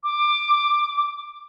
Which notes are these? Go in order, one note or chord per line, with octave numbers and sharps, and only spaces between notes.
D6